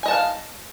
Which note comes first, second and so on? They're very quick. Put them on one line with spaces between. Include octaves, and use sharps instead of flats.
G#5 D#5 A5 F#5 F5